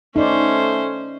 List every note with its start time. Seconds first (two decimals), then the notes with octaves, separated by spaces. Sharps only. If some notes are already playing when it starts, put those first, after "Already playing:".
0.16 A3 C#4 D#4 C5 D5